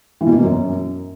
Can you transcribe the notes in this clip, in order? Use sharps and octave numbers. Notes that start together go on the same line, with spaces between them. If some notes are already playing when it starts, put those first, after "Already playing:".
E3
B2
A#3
B2
F#2